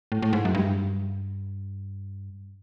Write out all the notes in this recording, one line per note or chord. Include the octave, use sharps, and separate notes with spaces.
A2
A2
G#2
F#2
G2